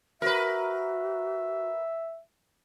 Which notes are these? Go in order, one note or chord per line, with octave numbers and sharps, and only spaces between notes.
F#4 A#4 B4 E5